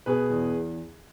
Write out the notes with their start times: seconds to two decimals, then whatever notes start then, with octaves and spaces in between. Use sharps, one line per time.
0.06 B2 G#4 B4
0.30 E2